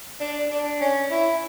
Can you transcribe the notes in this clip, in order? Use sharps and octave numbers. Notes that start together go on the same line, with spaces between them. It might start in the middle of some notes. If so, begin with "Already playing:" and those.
D4
D4
C#4
E4